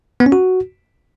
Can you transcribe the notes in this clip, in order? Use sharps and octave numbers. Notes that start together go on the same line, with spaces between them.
B3
C#4
F#4